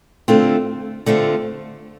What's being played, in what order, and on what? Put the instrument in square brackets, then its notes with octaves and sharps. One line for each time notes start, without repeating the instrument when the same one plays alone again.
[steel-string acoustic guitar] D3 A3 C4 F4
D3 A3 C4 F4